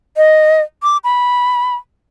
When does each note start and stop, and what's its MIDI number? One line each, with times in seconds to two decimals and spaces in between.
0.17 0.61 75
0.83 0.97 86
1.04 1.74 83